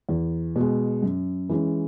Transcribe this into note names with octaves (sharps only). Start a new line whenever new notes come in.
E2
B2 G#3
F#2
E3 G#3 C#4